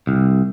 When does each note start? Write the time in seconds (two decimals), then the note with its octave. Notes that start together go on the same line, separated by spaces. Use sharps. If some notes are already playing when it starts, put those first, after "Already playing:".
0.07 C2